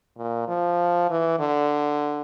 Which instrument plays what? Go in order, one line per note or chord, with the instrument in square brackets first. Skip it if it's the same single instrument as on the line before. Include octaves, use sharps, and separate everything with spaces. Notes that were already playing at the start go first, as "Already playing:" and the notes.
[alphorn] A#2
F3
E3
D3